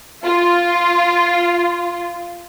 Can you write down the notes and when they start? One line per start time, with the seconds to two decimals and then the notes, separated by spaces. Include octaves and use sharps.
0.24 F4